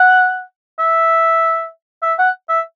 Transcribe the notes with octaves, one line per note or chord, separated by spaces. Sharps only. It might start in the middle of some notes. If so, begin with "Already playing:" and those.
Already playing: F#5
E5
E5
F#5
E5